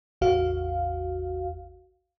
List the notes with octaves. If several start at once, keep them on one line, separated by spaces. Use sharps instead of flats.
A1 E2 F#4 F5